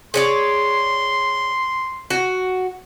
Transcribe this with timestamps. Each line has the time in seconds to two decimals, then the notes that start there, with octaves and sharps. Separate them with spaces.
0.14 G#4 C#5 D5 C6
2.10 F#4